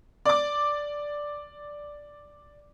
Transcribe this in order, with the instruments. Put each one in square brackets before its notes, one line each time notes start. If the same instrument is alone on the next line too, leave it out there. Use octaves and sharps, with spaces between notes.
[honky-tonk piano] D5 D6